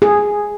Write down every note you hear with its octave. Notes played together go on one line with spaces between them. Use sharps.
G#4